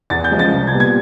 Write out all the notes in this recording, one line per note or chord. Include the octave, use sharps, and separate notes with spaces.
E2 A6
G6
C#3 F3 G#3
A6
C2
G#6
A#2 G3 B3
G#6